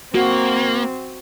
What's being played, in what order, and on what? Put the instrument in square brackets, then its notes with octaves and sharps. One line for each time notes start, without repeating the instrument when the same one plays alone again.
[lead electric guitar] A#3 [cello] C4 [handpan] F#4